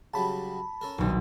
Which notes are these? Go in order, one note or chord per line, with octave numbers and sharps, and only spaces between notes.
C#3 F#3 G3 A5 B5
C#4 A4 A#4
D#1 B1